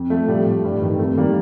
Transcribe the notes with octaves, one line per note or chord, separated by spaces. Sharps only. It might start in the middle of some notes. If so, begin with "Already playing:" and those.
Already playing: F2
F3 A3
A2 G3
A2
G2
D#3
F2 A3
D#3 G3 A#3